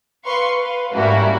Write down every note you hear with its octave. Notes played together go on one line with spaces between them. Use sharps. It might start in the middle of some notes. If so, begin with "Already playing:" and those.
B4 F5 C6 C#6
B4 F5
G#2 G3 A#3 C#4 E4 F#4